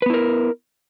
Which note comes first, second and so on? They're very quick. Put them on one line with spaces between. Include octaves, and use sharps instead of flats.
B4 B3 E4 A#4